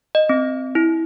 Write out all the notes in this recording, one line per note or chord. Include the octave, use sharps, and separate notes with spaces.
D#5
C4
E4